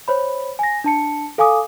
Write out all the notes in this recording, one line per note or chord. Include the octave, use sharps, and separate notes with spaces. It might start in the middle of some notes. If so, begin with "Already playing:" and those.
C5 C#5 B5
G#5 A#6
D4 A5 C#7
A4 F5 G#5 D6 D#6